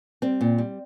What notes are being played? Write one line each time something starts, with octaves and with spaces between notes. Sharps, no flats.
G3 C4
A#2
G3